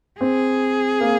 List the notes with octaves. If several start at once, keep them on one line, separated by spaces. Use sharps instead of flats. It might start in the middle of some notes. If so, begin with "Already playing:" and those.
C4 G#4
A#3